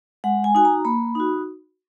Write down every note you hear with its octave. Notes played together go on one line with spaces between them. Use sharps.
G#3 F#5
G#5
D#4 F#4 G#5
A#5
A#3 B5
D#4 F#4